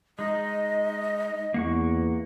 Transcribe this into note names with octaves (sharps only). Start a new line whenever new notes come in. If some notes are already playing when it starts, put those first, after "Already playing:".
G#3 D#4 D#5
E2 A#3 F#5 C#6